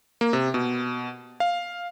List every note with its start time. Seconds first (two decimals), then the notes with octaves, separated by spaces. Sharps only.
0.21 A#3
0.33 C3
0.54 B2
1.40 F5